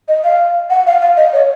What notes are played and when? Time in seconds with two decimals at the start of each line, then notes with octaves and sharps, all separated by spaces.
0.08 D#5
0.24 F5
0.70 F#5
0.87 F5
1.02 F5
1.17 D#5
1.33 C#5